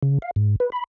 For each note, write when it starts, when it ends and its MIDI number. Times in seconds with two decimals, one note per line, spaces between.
0.03 0.18 49
0.22 0.31 77
0.36 0.56 44
0.60 0.70 71
0.72 0.84 83